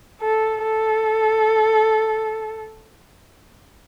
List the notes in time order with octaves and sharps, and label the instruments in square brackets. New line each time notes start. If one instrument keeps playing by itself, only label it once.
[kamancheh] A4
A4